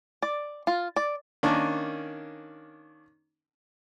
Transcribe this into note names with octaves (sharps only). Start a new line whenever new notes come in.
D5
F4
D5
D#3 A#3 C#4 D4